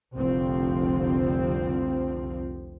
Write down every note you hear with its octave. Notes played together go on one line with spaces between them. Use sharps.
F1 C2 D3 F3 C4